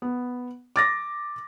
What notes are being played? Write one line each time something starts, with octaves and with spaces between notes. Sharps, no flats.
B3
D6 A6 A#6